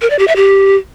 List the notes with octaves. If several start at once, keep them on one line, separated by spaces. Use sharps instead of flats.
A#4
D5
G4
E5
G4